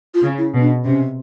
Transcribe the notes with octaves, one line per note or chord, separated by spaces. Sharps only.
F4
C#3
E4
B2
D4
C3 C#4